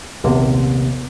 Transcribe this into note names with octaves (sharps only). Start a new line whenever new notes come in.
A#1 D#2 C3 A#3 B3